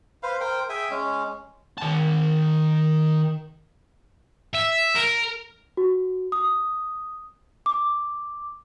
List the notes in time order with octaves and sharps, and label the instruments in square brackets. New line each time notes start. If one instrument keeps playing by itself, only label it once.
[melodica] B4 C5 F5
A#4 C5 G5
G#4 E5 G5 G#5
G#3 C#4
[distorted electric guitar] D#3 A5
E5
A#4
[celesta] F#4
D#6
D6